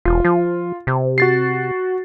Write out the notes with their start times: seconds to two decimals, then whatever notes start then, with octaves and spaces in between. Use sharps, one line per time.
0.05 E1 F4
0.25 F3
0.87 C3
1.18 F#4 A6 C7